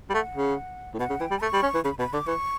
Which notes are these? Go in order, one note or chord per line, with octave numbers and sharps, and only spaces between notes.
G3
A3 F#5
C#3
A2
B2 F#5
C#3
E3 G5
G3
A3 C#6
G3
C#4
E3
C#3 B5
B2 B5
D3 D6
E3 C#6